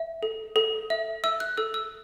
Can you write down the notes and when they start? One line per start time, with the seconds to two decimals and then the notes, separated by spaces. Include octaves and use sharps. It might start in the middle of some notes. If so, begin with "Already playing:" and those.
Already playing: E5
0.23 A4
0.56 A4
0.90 E5
1.24 E5 E6
1.40 F#6
1.57 A4 E6
1.74 E6